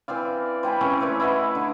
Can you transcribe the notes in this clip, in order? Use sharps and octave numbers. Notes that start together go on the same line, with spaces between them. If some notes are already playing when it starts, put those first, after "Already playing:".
E3 C4 D5 F5
C5 G5 G#5 B5
C#3 E3 C4 C#4
A3 E4 B4 D5
E4 B4 D#5 F#5
D3